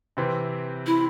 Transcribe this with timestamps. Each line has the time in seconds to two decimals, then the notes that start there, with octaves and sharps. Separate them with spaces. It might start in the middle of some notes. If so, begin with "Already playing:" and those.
0.17 C3 E3 C4
0.86 E4